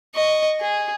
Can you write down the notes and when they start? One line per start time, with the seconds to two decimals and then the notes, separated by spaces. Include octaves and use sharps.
0.15 D#5 C#6
0.61 G#4